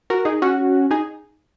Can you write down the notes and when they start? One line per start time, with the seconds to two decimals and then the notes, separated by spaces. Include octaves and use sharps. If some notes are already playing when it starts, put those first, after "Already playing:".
0.10 F#4 A#4
0.25 D#4 G#4
0.42 C#4 F#4
0.91 D#4 G#4